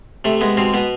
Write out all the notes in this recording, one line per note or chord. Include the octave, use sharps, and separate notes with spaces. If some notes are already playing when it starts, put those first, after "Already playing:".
C3 A3
G#3 B3
B2 C4
B2 B3